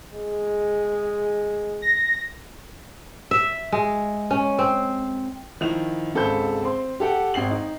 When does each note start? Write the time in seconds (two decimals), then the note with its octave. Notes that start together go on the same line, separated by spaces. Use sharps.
0.14 G#3
1.82 A#6
3.31 E5
3.72 G#3
4.31 C#4
4.59 C4
5.61 D#3 F3 E4 F7
6.14 G#1 C#2 A4 C5 B5 G6
6.63 C4 C6
7.00 G4 A4 F#5 G5
7.34 G#1 G5 C7 F#7
7.51 D#4